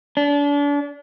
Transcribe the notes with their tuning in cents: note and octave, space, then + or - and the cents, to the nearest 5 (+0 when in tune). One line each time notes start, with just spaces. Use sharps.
D4 -35